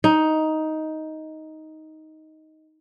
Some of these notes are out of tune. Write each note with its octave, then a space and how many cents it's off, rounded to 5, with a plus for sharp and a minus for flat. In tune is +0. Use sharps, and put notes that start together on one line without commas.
D#4 +10